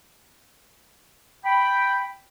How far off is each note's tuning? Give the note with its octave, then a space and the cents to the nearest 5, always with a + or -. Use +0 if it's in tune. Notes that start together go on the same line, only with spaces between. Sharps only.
G5 +0 B5 +5